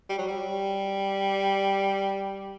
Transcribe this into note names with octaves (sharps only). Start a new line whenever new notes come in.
G3
F#3
G3